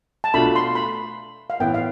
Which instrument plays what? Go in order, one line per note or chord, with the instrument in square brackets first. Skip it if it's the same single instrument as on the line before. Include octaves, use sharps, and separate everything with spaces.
[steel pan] A5
[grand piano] B2 A3 D4 F4 [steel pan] B5
[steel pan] C6
B5
F5
[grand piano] A2 E3 B3 [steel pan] G5
[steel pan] F5